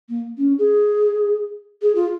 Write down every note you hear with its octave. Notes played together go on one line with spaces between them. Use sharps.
A#3
C#4
G#4
G#4
F4